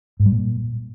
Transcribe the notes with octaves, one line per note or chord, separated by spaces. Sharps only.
G#2
G3
A#2